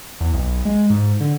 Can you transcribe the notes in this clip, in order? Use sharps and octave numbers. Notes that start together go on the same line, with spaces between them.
E2
B1
G#3
G#2
D3